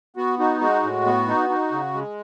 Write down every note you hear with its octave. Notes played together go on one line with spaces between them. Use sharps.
B3 F#4
D#4 F#4
G#3 F#4
A2
B3
D#4
D#4
C#3
G#3